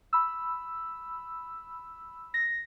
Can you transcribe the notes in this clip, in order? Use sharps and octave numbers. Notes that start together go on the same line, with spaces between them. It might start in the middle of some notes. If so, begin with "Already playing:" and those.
B5 E6
A#6